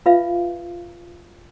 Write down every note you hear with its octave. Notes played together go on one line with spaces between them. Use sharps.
F4 B4 E5 F5